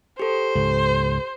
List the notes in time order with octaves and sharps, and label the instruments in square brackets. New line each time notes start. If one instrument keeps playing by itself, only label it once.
[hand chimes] G4 A4 [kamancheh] C5
[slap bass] C#2 G#2